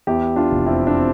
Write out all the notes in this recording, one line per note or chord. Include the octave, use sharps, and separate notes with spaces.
E2 E4 G4
D4 F4
F1
C4 E4
D4
C4